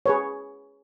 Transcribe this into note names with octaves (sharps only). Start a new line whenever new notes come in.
G#4 B4 C#5